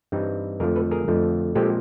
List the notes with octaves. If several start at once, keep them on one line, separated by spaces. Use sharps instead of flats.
G2 E3 G3 C4 D#4
F2 D3 F3 A3 G#4 A#4
A4 B4
G#4 A#4
F2 D3 F3 A3
A#2 F3 G#3 C4 G4 A4